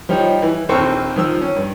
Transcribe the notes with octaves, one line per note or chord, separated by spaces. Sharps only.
F3 G3 D#4 G4 C#5
E3
A#1 D#2 C4 A4 A#4 C#6
D#3 F3 E6
C#4
G2